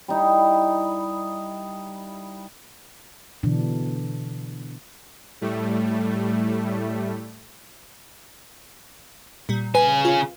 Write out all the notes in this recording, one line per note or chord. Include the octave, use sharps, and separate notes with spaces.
G3 D#4 E4
B2 D3 E3 D4
A2 G3 A3
A#2 G3
C#3 B4 G#5
F4